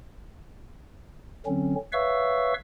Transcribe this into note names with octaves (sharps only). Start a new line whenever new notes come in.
D3 F#3 C4 C#4
B4 C#5 E5 F5 C#6 E6